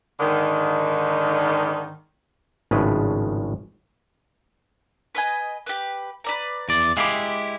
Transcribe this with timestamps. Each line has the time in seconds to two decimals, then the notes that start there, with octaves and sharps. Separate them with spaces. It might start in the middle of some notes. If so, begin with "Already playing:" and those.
0.20 G#2 D3 D#3
2.71 G#1 A2 C#3 F3 G#3 B4
5.15 B4 D#5 G#5
5.66 G4 B4
6.24 B4 D5 A#5
6.69 E2 D5
6.97 G#3 E4 G4 F5 B5 D6